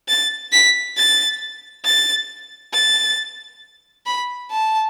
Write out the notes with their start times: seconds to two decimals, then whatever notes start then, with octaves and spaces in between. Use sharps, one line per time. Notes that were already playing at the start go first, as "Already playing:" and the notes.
0.08 A6
0.52 B6
0.97 A6
1.85 A6
2.73 A6
4.06 B5
4.50 A5